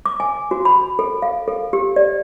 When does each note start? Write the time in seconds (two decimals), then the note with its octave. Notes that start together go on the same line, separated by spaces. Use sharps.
0.06 D6
0.20 G#5
0.51 F#4
0.65 B5
0.99 A4
1.22 F5
1.48 A4
1.73 G4
1.96 D5